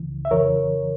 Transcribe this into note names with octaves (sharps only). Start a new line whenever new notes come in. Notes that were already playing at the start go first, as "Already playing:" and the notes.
Already playing: C#2 C#3 E3
E5
F2 C#3 E3 A#4 C#5